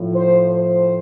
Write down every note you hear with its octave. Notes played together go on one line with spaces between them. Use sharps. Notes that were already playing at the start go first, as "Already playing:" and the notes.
Already playing: A2 F3
C5
C5